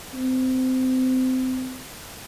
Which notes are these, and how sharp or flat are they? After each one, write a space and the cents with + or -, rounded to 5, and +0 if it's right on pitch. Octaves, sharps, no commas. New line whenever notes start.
C4 -25